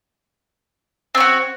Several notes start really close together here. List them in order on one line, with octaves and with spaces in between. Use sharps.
C4 C#5 F#4